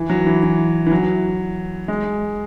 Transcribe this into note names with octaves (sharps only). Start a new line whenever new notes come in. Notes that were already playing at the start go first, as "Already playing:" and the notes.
Already playing: E3
F#3
E3
E3
E3
F#3
G#3